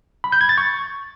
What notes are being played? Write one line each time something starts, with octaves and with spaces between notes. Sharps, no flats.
B5
G6
G#6
A6
C#6